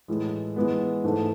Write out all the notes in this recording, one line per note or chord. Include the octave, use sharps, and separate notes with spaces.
A2 E3 G#3
E3 G#3 B3
G#2 E3 A3